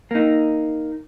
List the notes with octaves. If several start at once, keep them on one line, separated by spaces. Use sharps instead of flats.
A#3 D#4